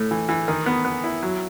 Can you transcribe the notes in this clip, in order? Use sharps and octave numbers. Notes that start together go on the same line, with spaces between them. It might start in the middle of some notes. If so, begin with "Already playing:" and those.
Already playing: A2 A3
E3
E3
D#3
B3
B3
E4
F#3